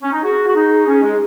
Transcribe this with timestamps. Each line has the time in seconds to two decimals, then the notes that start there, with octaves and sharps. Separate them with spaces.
0.02 C#4
0.13 D#4
0.23 F#4 G#4
0.47 F#4
0.56 D#4
0.87 C#4
1.03 G#3